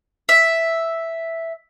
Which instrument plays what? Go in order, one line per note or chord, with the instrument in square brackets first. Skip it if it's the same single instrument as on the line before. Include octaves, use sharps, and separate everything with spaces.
[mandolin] E5